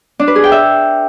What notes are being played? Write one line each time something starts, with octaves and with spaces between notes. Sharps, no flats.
D4
B4
G#4
G5
E5